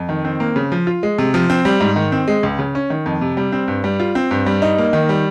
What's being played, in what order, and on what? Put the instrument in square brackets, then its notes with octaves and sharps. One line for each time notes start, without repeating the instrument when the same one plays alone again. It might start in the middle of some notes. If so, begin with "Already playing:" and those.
Already playing: [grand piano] F2
D#3
C4
A#3
C#3
F3
F4
G#3
C3
F3
C4
G3
G#2
D#3
C4
G#3
C#2
C#3
C#4
D#3
F2
C3
G3
C4
G2
G3
F4
C4
G2
G3
D#4
A#3
D#3
G3